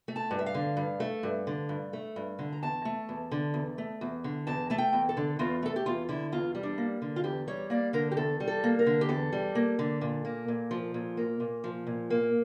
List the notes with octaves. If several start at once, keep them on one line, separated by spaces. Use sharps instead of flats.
A3
A5
G2
E5
F5
D3
G2
A3
G2
D3
G2
A3
G2
D3
A#5
E2 A5
A3
E2
D3
E2
A3
E2
D3
E2 A5
A3 A5
G5
E2
A4
D3
E2 F4
A3 A4
G4
E2 F4
D3 E4
E2 F4
G3
D4
A#3
D3
F4
E2 G4
G3 C#5
A#3 D5
D3 A#4
G4
E2 A4
G3
A4
A#3
A#4
D3
G4
E2 A4
G3
A#3
D3
A#2
A#3
A#2
F3
A#2
A#3
A#2
F3
A#2
A#3